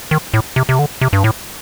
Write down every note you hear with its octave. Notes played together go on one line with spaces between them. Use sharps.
D#3
A2
C3
C3
D3
C3
G2
A2